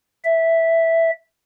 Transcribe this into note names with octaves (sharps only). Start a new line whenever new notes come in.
E5